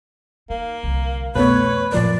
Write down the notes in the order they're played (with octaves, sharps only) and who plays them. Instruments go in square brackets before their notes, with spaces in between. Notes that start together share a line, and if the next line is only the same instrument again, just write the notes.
[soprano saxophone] A#3 [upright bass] D#4
[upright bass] C2 D3
[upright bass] F2 [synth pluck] B2 A3 B3 [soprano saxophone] B4 [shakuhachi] C#5
[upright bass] A#1 F#2 [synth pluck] A#2 F3 A#4 [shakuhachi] D5